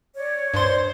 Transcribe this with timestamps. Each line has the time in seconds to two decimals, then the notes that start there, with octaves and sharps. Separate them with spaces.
0.16 C#5 D5
0.54 G2 C5 C6